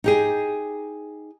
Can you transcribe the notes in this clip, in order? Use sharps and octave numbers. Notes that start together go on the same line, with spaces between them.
D#4 G4 G#4